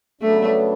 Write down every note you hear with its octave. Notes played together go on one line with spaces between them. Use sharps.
C#3 F#3 A3 B3 D4